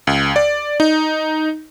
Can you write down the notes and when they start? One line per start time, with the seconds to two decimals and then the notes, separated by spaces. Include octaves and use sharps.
0.07 C#2
0.36 D5
0.80 D#4